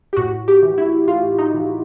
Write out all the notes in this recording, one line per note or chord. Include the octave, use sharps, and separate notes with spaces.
G4
A2 F#4
G4
E3
E4
A2 F4
D#4
E3